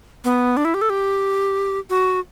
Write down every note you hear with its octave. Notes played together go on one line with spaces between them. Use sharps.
B3
D4
E4
G4
A4
G4
F#4